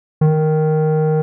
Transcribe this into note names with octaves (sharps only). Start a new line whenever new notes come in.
D#3